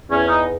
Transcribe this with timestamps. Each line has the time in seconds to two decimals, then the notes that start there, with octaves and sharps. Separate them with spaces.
0.10 E2 C#4
0.28 D#4